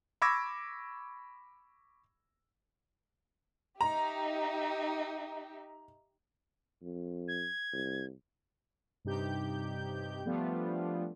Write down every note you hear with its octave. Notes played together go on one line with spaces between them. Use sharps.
B5 C#6 D6 E6 G#6 A#6
D#4 G4 E5 A#5
F2
G#6
C2
G2 C3 D#4 G4 G6
F3 G3 A3 B3 D4 F4